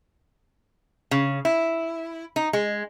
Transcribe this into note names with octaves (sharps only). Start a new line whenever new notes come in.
C#3
E4
D#4
G#3